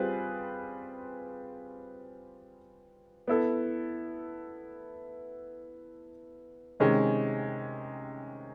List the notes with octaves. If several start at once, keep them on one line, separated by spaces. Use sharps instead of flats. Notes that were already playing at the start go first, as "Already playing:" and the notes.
Already playing: G3 C4 F4 G#4 B4
B3 E4 A4
C3 D#3 G#3 C#4